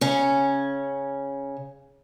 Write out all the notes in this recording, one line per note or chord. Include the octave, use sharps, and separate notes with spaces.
C#3 C#4